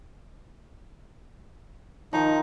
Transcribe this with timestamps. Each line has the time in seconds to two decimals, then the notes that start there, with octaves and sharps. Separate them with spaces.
2.13 D#3 F3 D#4